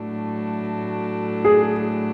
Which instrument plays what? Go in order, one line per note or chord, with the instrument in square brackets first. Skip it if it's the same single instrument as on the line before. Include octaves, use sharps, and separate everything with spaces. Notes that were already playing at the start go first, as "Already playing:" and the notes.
Already playing: [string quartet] A2 F#3 A3 D4
[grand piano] G#4